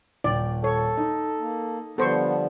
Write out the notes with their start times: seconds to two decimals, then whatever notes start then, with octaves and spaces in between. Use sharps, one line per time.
0.24 D#1 D5 G5
0.64 A4 C#5
0.97 D#4
1.39 A#3
1.98 D3 F3 G3 B3 A4 C5 C#6